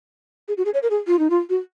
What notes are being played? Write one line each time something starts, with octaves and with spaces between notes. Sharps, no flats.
G#4
F#4
G#4
C#5
A#4
G#4
F4
D#4
F4
F#4